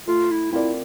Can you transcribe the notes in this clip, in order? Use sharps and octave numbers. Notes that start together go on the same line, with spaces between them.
A3 F4
E4
C4 E4 F4 A#4 D5